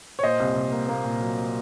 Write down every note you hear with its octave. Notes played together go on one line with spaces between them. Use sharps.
C#5
A#2 C5 D#5
C2
C2
A#3
A#3
A#2
F#3